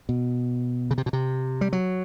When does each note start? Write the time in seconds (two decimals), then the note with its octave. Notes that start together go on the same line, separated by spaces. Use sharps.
0.09 B2
0.91 C#3
0.98 C3
1.06 B2
1.13 C3
1.61 G3
1.73 F#3